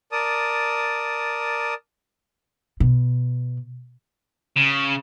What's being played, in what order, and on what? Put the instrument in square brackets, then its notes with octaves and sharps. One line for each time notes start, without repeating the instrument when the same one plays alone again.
[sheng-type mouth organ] A#4 D5 A5 D#6
[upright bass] B2
[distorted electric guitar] C#3